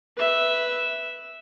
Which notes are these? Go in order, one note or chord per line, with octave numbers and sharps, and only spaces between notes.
B4 E5